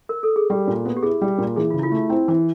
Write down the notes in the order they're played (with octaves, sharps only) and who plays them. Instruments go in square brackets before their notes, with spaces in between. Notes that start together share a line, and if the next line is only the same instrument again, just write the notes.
[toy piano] A#4
A4
G#4
[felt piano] G3 [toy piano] G4
[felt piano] A#2
B3
[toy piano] G4
[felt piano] E4 [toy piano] G#4
[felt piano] G3
A#2
[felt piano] E3 [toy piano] G#4
[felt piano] C#3 [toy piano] F4
[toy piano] E4
F4
[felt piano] A3
[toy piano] F4
[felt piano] C4 [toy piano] E4
[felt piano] E3